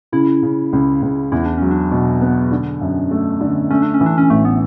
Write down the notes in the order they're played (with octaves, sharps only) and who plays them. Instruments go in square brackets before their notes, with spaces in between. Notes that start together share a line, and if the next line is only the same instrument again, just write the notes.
[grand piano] C#3 [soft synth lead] E4
[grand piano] C#3
C#2
C#2
[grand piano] E2 [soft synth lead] E4
[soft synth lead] D4
[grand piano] F#3 [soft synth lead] C#4
[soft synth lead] D4
[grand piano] B2
B3
D3
F#2
A3
D3
[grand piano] A3 [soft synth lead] C#4
[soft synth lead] D4
C#4
[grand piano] E3
[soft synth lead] D4
C#4
[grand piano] A1 [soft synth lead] A3
[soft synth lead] B3